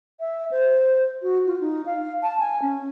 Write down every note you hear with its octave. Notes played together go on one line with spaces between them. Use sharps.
E5
C5
F#4
F4
D#4
F5
A5
G#5
C#4